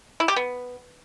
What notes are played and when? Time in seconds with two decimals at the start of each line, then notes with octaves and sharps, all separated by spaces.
0.20 E4
0.28 G4
0.36 B3